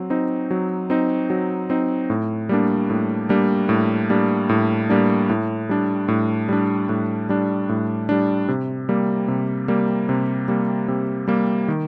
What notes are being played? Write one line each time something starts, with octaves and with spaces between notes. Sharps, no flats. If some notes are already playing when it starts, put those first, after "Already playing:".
Already playing: F#3 C4
C4 D#4
F#3
C4 D#4
F#3
C4 D#4
A2
G3 A#3 D4
A2
G3 A#3 D4
A2
G3 A#3 D4
A2
G3 A#3 D4
A2
G3 D4
A2
G3 D4
A2
G3 D4
A2
G3 D4
C3
G3 A#3
C3
G3 A#3
C3
G3 A#3
C3
G3 A#3
D#3